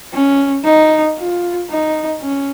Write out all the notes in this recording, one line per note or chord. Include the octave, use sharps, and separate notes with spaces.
C#4
D#4
F4
D#4
C#4